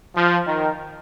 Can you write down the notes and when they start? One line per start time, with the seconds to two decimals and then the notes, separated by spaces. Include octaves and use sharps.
0.15 F3
0.47 D#3